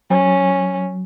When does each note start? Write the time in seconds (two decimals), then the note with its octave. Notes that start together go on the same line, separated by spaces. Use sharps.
0.10 F#3 C#4